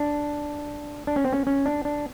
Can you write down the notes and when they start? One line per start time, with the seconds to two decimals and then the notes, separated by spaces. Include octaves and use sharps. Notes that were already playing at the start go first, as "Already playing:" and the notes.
Already playing: D4
1.07 D4
1.16 C#4
1.25 C4
1.33 C#4
1.47 C#4
1.66 D4
1.85 D4